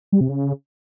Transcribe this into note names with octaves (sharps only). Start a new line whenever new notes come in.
G3
C3
C#3